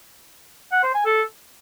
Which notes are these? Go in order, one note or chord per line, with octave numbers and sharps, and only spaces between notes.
F#5
C5
G#5
A4